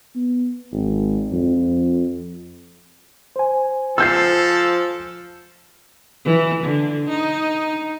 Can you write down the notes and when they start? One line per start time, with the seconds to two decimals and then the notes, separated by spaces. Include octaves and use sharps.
0.15 B3
0.72 G#1
1.32 F2
3.36 C5 G#5
3.98 F3 A4 E6 G6 C7
6.25 E3
6.63 D3
7.09 D#4